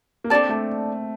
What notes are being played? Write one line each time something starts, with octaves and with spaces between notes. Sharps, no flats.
A#3
C4 D4 A4 D5 A5
A3